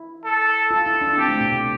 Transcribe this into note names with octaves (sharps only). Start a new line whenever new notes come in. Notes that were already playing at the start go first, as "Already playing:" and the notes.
Already playing: E4
A4
F4 A4
E4
D4
C4 G4
A3
B2
C3